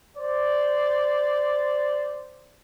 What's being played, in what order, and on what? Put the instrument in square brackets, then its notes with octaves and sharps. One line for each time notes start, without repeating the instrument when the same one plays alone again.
[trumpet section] C5 D5